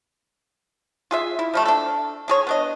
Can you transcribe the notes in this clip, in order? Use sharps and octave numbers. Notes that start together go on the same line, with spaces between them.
F4 G#4 E5
E4
F3 G3 A3
D4 A4
D4 G#4 C#5
B3 D4 D#5